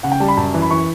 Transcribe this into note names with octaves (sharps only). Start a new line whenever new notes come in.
C#3 F#5
G5
G3 A5
B5
F#2 A5
E3
B5
E3 C#6